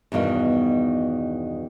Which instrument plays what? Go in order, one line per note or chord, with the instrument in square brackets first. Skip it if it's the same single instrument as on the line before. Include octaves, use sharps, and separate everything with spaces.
[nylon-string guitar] E2 G2 B2 D#3